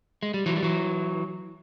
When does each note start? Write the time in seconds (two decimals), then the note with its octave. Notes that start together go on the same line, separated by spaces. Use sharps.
0.23 G#3
0.34 G3
0.46 E3 F#3
0.56 G3
0.63 E3 F#3